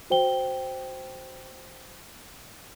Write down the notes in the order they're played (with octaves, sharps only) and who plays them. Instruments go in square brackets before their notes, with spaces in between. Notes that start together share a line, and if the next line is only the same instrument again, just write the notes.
[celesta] F#4 C5 G5 G7